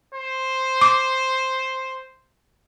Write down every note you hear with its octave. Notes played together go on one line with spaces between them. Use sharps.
C5
D6